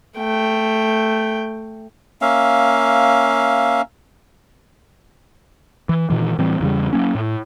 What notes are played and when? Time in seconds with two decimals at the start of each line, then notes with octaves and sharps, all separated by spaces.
0.17 A3 G5
2.21 A#3 C#4 E5 F5
5.89 E3
6.10 A#2 D#3 E3
6.38 A2 E3 G3 C4
6.60 E2 C#3 G3
6.93 F#3 A#3 C#4
7.15 A2